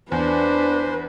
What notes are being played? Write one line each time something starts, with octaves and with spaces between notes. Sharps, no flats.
E2 D4 B4 C5